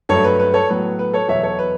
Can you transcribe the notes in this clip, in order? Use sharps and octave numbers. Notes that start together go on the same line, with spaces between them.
G2 F#3 A3 A4 C#5
B4
B4
A4 C#5
A2 F#3 B3 B4
B4
A4 C#5
E2 B2 F#3 C#5 E5
A4 C#5
B4